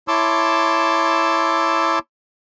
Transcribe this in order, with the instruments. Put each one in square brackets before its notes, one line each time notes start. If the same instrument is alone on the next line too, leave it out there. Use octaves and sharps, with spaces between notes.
[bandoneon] E4 C#5 A5 C6 D6 E6